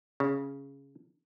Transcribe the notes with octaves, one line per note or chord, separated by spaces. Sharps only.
C#3